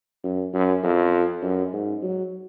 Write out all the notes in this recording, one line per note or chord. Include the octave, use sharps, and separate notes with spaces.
F#2
F#2
F2
F#2
G#2
F#3